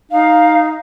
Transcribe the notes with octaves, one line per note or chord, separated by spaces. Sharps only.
D#4 F5